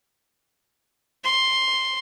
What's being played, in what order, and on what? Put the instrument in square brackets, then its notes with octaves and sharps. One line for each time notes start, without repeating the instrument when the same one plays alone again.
[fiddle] C6